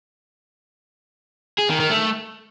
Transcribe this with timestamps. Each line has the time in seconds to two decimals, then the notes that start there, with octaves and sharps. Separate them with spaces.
1.59 G#4
1.69 D#3
1.80 D#3
1.90 A3